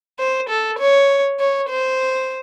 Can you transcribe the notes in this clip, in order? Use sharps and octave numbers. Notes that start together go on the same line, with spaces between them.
C5
A4
C#5
C#5
C5